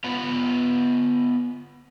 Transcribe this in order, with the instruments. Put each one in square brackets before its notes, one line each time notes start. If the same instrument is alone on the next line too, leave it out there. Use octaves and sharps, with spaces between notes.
[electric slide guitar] B3 F4 F5 F#5